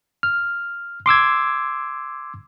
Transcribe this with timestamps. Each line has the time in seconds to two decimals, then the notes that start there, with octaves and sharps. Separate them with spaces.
0.23 F6
1.06 C6 D6 E6 G#6